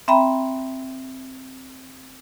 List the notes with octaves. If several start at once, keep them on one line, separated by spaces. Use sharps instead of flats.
C4 E5 G5 A#5 B5